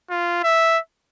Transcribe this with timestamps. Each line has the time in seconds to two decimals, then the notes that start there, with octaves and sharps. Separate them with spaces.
0.10 F4
0.43 E5